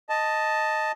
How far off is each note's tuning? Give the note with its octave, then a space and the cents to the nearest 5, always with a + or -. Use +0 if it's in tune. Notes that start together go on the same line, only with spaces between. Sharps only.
D#5 +0 A5 +0